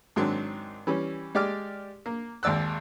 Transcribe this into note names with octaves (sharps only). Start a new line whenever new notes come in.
G#2 D#3 F#3 C4 D4
E3 G3 C#4
G#3 G4 D5 D6 F6
A#3
G#1 D#2 D5 E6 F#6